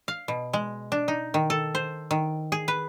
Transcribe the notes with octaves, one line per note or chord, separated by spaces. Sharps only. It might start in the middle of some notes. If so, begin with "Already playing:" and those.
F5
B2
G#3
D4
D#4
D#3
A4
C5
D#3
G#4
B4